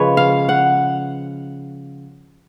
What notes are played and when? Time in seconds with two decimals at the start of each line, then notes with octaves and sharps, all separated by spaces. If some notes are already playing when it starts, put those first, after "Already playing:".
Already playing: C#3 F3 G#3 B4 C#5
0.17 F5
0.49 F#5